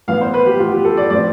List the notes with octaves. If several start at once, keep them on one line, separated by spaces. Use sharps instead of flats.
A2 E3 B3 F5
C5
B4
G4
A2 E3 B3 F4
G4
A4
D5
A2 F3 C4 D5